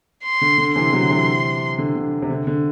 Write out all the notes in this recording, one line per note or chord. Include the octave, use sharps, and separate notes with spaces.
C6
D3
D3
C3 E3 C6
D3 F#3
D3
C3 E3
D3
D3
C3
D3
D3